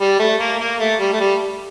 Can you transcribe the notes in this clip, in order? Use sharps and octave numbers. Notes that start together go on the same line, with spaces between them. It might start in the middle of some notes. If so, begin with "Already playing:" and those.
G3
A3
A#3
A#3
A3
G3
A3
G3